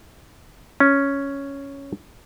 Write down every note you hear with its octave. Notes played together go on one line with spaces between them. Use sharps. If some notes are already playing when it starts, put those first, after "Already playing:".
C#4